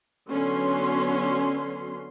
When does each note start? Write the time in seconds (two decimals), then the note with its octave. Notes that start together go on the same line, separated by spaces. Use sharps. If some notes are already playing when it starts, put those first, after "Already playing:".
0.29 D3 F#3 B3 C#4 C6